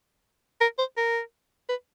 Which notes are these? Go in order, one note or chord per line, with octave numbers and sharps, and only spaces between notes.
A#4
C5
A#4
B4